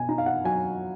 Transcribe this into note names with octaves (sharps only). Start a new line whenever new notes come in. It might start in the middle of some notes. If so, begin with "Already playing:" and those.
Already playing: B2 G#5
D#4 A#5
F5
F#5
F#3 G#5